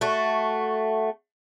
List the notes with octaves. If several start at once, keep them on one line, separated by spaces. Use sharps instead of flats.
A3 F#4